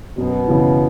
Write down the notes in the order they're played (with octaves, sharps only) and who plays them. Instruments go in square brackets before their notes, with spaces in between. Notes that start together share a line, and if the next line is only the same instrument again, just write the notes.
[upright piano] F#2 [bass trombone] B2
[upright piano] C#3 E3